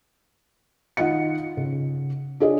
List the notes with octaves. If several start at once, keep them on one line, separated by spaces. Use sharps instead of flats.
D#3 F4 D#5 F#5 C#7
C#3
D4 F4 G#4 C#5 D#5